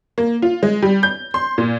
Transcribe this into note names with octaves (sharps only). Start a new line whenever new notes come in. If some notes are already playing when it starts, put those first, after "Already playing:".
A#3
F4
G#3
G3
G6
C6
A#2